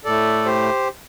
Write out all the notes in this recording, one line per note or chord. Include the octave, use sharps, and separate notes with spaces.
A2 A3 A4 D5
G4 C5